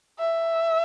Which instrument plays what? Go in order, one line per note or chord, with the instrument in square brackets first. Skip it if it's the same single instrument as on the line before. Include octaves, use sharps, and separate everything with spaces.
[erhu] E5